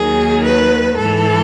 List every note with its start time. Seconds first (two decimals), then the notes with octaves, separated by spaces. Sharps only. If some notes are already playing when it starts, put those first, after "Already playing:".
Already playing: D#2 D#3 F#3 G#4
0.45 B4
0.98 G#2 E3 A4